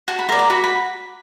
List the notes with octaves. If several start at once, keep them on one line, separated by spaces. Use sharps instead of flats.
F#4 A5
B5
A#4 D5 C6
A#5
F#4 B5
B5